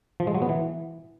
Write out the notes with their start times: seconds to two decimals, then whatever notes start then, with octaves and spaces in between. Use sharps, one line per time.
0.20 F3
0.27 G#3
0.35 F#3
0.42 B3
0.49 E3